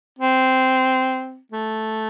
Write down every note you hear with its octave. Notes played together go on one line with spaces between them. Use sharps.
C4
A3